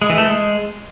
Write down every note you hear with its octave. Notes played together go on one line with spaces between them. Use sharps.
G#3
E3
A3
G#3